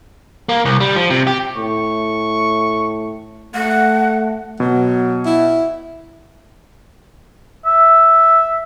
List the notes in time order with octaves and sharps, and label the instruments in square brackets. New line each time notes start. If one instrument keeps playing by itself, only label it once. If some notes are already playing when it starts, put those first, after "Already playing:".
[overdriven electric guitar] A#3
C2
G3
F3
C3
G4
[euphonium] A2 [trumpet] C#6
[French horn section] A3 [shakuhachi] F#5
[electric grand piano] B2 [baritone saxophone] F#3
[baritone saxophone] E4
[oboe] E5